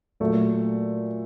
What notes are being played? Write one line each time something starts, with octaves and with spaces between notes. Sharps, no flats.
A#2 F#3 A3